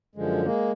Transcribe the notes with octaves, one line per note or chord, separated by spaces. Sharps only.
F#2 D3 F3 G#3
G#3 A#3